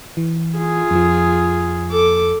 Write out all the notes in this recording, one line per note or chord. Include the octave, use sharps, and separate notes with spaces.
E3
F4 G#4
F2 F3
A4 D6